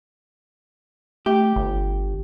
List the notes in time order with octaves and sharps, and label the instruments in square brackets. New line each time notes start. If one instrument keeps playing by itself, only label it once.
[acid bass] A3 [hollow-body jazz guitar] G4
[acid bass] G1